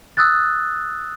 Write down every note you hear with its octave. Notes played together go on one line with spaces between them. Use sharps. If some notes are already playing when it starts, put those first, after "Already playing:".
D#6 E6 F#6 A6